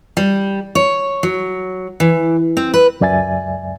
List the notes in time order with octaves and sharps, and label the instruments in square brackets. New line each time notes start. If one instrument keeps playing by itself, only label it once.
[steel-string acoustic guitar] G3
C#5
F#3
E3
C4
B4
[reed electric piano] C#2 F#2 D5 E5 G#5 A6